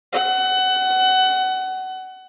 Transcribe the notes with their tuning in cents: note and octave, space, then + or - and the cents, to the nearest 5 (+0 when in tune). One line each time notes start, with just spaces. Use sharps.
F#5 +25